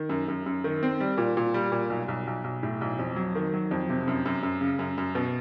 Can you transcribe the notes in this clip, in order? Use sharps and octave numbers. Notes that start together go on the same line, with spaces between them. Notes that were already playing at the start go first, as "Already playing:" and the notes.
Already playing: D#3
F#2
F#2
F#2
D#3
C4
G3
A#2
A#2
G3
A#2
B1
B1
B1
B1
A2
B1
F2
F#3
D#3
F#3
F2
C3
F#2
F#2
F#2
C#3
F#2
F#2
B2